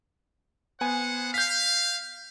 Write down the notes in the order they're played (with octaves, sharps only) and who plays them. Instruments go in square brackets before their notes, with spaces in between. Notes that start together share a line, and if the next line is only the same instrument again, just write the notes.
[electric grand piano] B3 G#5 [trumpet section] C5 F#5
[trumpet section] F5 [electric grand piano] G6 B6